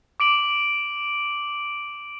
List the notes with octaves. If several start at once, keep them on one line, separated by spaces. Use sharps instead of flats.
D6 D7 F#7